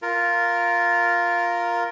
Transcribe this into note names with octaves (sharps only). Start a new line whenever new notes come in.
F4 A#4